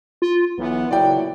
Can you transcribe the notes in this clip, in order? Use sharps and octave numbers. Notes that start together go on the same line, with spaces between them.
F4
B1 E3 B3
F#1 A#2 F#3 E4 D5 G5